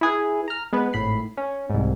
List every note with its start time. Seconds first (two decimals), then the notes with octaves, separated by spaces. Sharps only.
0.01 E4 G#4 B4
0.48 A#5 F6
0.73 G#3 B3 B4
0.93 G#1 A2 B5 C7
1.37 C#4
1.70 C2 G#2